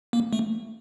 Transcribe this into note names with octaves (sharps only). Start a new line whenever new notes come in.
A#3
A3